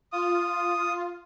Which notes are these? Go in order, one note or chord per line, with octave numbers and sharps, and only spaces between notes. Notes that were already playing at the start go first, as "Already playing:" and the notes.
F4 D#6